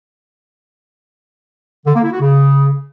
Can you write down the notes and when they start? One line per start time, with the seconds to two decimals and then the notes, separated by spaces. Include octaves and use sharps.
1.86 D3
1.94 A#3
2.03 E4
2.12 F#4
2.20 C#3